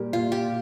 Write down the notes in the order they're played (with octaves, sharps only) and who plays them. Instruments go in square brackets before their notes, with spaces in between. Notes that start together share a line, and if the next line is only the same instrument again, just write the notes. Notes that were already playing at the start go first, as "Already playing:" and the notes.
Already playing: [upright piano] A#2 G3 A#3 [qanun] G4
[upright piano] A#2 [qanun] F4
[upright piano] A#2 [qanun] G4